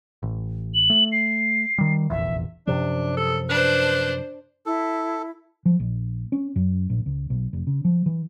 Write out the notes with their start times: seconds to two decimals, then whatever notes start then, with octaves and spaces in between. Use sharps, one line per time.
0.23 A1
0.74 F#7
0.90 A3
1.12 C7
1.78 D#3 G3
2.10 F1 A#1 E2 E5
2.67 F#2 C3 F3 D4
3.17 A4
3.49 D4 B4 C5
4.66 E4 A4
5.65 F3
5.80 A#1
6.32 C#4
6.56 F#2
6.90 A#1
7.06 C#2
7.30 B1
7.53 F1
7.67 C#3
7.85 F3
8.06 E3